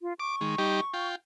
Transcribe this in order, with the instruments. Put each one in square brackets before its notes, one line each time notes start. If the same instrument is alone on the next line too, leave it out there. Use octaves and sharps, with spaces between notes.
[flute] F4
[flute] C#6 [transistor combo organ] D6
[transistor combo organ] D#3 G#3
G3 D#4 G4
F4 G5